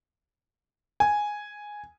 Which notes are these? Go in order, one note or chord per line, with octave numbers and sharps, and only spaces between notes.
G#5